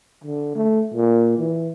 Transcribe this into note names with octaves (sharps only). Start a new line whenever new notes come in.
D3
A3
A#2
E3